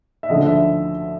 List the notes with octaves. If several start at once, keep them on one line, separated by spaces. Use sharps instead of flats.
E5
D2 D3 F3 D#5
E5